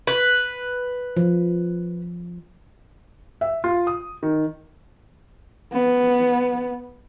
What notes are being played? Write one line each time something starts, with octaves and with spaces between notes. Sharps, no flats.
B4
F3
E5
F4
D#6
D#3
B3